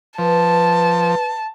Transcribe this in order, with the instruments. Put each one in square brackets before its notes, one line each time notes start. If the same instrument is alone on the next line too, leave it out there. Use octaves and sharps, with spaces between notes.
[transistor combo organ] F3 [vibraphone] B4 [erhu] A5